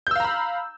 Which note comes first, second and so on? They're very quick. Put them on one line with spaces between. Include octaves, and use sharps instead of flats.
G6 E6 F5 A#5 B5